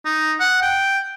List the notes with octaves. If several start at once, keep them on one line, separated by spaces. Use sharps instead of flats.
D#4
F#5
G5